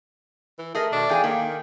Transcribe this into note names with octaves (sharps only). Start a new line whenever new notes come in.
E3
A3 G#4 A#4 D#5
B2 D#3 D4
E2 G#4 F5 G5 G#5
D#3 A#3